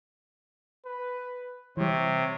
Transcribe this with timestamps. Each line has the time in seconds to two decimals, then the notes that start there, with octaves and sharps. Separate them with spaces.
0.85 B4
1.77 C3 E3 G3 C#5